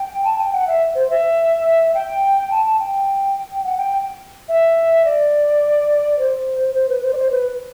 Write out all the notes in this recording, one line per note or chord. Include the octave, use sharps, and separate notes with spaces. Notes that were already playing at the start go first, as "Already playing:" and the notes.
Already playing: G5
A5
G5
F#5
E5
C5
E5
G5
A5
A5
G5
F#5
G5
E5
D5
C5
C5
B4
C5
D5
C5
B4